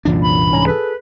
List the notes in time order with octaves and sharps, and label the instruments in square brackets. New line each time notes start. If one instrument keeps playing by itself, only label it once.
[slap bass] C2 E3 D4 [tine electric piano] F#2 A#2
[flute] B5
[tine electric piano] G#2 C#4 A#5
[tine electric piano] G#4 A4 [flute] B4